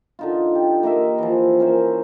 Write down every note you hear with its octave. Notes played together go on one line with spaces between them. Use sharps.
D3 D#4 F4
G4
A#3 A#4 D#5 E5
E3 F3
C#4 A#4 C5 E5